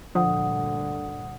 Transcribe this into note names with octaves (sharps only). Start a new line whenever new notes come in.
D2 G2 A#2 D3 F3 F#5 D#6